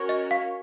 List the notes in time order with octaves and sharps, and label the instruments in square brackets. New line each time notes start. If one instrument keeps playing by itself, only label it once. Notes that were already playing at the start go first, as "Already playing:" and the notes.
Already playing: [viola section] C#4 F#4 A#4 C#5
[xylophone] D#5
F5